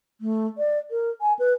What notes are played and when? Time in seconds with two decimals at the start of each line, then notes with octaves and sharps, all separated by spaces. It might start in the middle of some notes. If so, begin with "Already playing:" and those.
0.21 A3
0.58 D5
0.91 A#4
1.21 G#5
1.39 B4